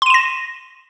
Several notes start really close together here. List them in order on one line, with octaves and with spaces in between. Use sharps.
C6 D#7 E7 A#6